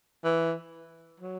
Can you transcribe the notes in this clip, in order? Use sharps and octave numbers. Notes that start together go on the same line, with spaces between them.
E3
F#3